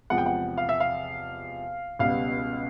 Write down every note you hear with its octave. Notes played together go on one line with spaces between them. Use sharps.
E2 C3 F3 G#3 F#5
G5
F#5
F5
E5
F5
C#2 B2 G3 B3 F5